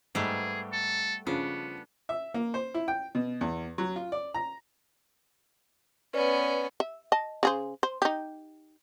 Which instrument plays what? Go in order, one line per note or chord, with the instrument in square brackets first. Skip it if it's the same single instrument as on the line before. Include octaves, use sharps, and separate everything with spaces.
[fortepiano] G#2 [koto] G3 A3 B3 [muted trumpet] G#4
[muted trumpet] A4
[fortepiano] C#3 F3 [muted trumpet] B3 [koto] D4
[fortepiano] E5
A#3
C5
E4
G5
B2
E2
F#3
F4
D5
A#5
[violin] B3 C#4 [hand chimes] B4 D5
[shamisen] E5
D#5 A5
C#3 G#4 C5
C5
D#4 G4